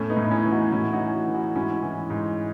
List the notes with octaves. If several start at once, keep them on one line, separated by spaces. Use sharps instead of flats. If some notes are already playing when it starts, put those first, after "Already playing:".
Already playing: E2 A2 A3 C#4
B3 D#4
A2
D#4
C#4 E4
E3
D#4 F#4
A2 C#4 E4
D#4 F#4
E3
E3
D#4 F#4
G#2 C#4 E4
E3
G#2